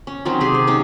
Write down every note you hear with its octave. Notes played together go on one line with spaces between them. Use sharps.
C#4
D#3 F#3 C4 C#4
C3 G4 G#4
C5
F#3 C#4 D#4